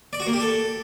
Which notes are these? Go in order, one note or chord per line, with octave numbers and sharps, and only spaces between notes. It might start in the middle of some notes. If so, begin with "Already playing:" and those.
D5
F#4
A#3
G4
A4